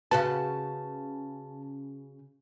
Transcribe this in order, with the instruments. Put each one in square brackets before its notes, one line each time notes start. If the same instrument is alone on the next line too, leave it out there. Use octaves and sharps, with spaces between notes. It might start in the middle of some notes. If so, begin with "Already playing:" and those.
[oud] C#3 F#4 B4 [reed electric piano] A5